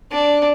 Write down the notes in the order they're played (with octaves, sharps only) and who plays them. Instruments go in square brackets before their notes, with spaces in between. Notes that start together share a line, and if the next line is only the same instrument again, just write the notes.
[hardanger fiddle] D4